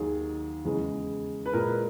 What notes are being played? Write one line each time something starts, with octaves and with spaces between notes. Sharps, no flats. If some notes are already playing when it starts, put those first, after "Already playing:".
Already playing: D#2 D#3 F#3 G#4
E2 C#3 G#3
B4
A#2 G#3 A#4